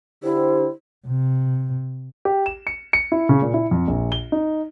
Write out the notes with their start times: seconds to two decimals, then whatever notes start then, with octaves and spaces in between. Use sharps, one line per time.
0.23 D3 E4 G4 C5
1.07 C3
2.25 G4
2.46 E7
2.67 C#7
2.93 C#7
3.12 E4
3.29 C#3
3.42 A#2
3.54 E4
3.71 F2
3.88 A#1
4.12 G7
4.32 D#4